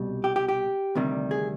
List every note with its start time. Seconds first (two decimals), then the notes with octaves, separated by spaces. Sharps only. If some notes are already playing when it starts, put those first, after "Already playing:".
Already playing: C2 B2 G3
0.24 G4
0.36 G4
0.48 G4
0.95 D2 C3 D#3 G3
1.31 G#4